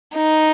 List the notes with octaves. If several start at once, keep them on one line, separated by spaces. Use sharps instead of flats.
D#4